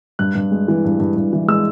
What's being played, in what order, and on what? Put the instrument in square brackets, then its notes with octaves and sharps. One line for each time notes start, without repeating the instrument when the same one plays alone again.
[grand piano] G2 F#6
G2
G#3
E3
G2
G2
G2
E3
G#3 E6